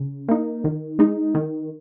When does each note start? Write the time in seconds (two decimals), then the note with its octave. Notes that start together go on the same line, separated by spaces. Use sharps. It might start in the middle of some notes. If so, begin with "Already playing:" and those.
Already playing: C#3
0.29 A#3 D#4
0.64 D#3
0.99 G#3 D#4
1.35 D#3